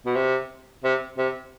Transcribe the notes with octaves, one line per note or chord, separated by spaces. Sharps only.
B2
C3
C3
C3